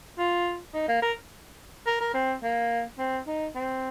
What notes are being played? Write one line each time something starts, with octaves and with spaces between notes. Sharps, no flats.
F4
D#4
A#3
A#4
A#4
A#4
C4
A#3
C4
D#4
C4